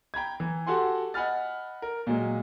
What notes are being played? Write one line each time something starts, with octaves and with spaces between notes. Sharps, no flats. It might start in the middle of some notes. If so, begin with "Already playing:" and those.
G5 A#5 B5 G#6
E3
F#4 G4 A4 F#5 G#5 C6
D#5 F#5 G#5 B5 F6 A6
A#4
A#2 F#3 G#3